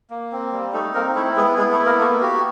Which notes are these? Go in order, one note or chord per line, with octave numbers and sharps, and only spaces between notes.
A#3
C4
G3
A3 D#4 A4
A#3 C4 A#4
A3 E4 A4
G#3 B3 G#4
G#3 E4 G#4
A3 A4
B3
A#3 A#4
A3 A#3 A4
F#4 G4